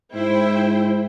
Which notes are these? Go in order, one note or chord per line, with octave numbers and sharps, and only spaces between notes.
G#2 E4 C5 G5